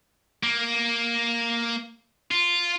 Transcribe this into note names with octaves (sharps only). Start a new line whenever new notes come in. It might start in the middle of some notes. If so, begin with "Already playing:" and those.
A#3
F4